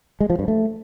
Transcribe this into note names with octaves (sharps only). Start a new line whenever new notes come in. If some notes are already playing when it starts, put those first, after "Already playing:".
G#3
F3
G2
A3